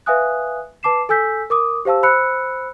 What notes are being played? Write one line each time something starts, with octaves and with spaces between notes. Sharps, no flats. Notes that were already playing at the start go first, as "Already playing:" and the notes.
B4 E5 F5 G#5 D#6 F#6
B4 A5 D6 C7 E7
A4 G#5 E6 G6 B6
A#4 D6 D#6
G4 C5 F5 A5 E6
C5 B5 E6 F#6 C#7